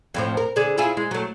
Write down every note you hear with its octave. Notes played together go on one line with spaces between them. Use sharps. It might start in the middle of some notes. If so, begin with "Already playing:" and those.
F2 A2 F3
A#4
D3 G#4
E4 F4 G#4
G#3
F#3 A3